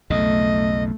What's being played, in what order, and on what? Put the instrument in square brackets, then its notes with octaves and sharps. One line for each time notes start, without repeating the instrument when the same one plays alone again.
[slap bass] B1 F2 C#3 [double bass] A3 [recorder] D#5